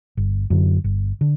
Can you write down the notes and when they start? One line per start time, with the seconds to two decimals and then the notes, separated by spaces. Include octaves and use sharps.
0.17 G1
0.50 F#2 D3
0.84 G1
1.21 D3